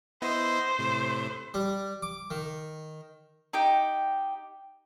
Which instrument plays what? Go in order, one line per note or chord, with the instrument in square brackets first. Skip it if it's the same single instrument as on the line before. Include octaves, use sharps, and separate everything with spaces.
[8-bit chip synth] B3 E4 D#5 [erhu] C5
[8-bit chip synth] A2 C3
[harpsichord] G3
D6
D#3
[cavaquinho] D#4 G4 G5